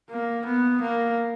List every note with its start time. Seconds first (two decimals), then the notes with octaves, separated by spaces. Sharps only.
0.10 A#3
0.46 B3
0.82 A#3